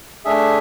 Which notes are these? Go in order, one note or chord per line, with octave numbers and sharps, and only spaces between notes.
A3 D4 G#4 E5